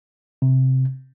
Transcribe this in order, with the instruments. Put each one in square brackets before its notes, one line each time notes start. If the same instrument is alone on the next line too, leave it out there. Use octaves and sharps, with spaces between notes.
[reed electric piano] C3